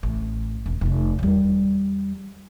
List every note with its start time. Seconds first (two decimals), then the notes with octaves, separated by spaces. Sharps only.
0.03 A1
0.66 E1
0.81 F1 D#3
1.19 E2 G3